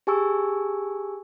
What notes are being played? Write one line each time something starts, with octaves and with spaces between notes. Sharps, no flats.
G4 G#4 G#5 A5 C#6 E6